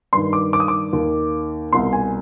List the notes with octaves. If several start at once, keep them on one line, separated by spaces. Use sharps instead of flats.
G2 D#3 C6
D6
D6
D#6
D6
D#2 D#3
C2 B2 C6
G#5